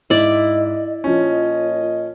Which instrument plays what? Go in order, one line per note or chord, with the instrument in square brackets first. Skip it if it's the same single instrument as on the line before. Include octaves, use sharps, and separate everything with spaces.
[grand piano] G#2 [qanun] E4 D5 [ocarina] D#5
[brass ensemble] A#2 C#5 D#5 [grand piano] F3 C#4 [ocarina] F4